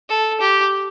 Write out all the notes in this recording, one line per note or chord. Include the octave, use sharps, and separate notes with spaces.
A4
G4